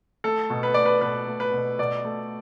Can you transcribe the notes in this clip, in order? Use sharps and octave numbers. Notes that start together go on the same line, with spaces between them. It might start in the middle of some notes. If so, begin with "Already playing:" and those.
A3 A4
B2
B4
A3 D5
B4
B2 B4
A3
B4
B2
B2 D5
A3